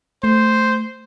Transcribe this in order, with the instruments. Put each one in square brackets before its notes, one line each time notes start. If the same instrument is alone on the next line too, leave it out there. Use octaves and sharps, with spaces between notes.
[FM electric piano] A3 [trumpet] C5